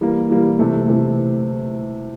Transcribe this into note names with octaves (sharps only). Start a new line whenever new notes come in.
E3 G3 A#3
E3 G3 A#3
C3 E3 A3
C3 E3 A3